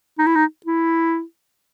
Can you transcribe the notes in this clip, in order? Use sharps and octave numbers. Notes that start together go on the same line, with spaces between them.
D#4
E4
D#4
E4